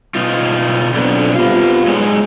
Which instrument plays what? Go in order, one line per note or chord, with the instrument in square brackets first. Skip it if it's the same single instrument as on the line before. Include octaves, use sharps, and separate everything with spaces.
[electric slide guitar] B2 D#4 F4
[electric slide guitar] B2 F#3 D4 [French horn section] C4 F4 A4
[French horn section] C3 F4 [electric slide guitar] B3 F5
[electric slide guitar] F#3 G#3 D#4